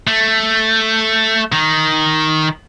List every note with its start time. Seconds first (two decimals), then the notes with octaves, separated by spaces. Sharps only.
0.07 A3
1.52 D#3